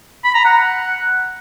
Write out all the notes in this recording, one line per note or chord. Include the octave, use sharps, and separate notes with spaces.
B5
A#5
F#5